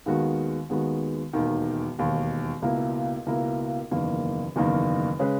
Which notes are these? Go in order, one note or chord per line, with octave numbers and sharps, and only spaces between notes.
D#2 D#3 G#3 B3 F#4
D#2 D#3 G#3 B3 F#4
E1 D#2 D#3
E1 D#2 D#3
C#2 B2 A#3 E4 A#4
C#2 B2 A#3 E4 A#4
F#1 E2 D#3 A#3
F#1 E2 D#3 A#3
C#3 G#3 C#4 G#4 B4